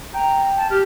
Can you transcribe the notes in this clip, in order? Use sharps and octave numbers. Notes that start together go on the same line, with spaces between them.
G5 A#5
A5
G4 F6